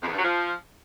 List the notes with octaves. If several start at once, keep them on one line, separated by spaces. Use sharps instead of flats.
F2
E2
G2
F#3
F3